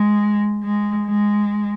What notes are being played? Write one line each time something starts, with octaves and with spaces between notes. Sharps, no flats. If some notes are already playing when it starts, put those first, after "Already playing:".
Already playing: G#3
G#3
G#3